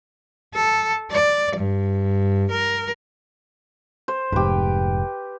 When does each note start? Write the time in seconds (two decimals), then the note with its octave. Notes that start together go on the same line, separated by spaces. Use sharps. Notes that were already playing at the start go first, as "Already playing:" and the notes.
0.54 A4
1.11 D5
1.56 G2
2.50 A#4
4.08 C5
4.32 F1 G#2 G4 B4